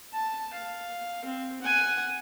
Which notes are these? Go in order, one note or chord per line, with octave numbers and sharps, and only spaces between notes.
A5
F5
C4
F#5 G#5